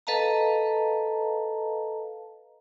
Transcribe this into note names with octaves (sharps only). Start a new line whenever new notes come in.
A4 B4 D#5 F5 A5 A#5